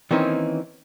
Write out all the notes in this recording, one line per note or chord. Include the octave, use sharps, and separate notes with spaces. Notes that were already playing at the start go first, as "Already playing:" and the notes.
D#3 E3 A#3 C4 C#4 D#4